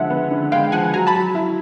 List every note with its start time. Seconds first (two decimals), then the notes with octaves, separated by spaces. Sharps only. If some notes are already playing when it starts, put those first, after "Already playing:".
Already playing: D3 F3 G#3 E5 F#5
0.10 B3
0.31 D3
0.52 G#3 F5 G5
0.72 F3 F#5 G#5
0.94 F#3 G#5 A#5
1.07 A5 B5
1.15 F#3
1.35 E4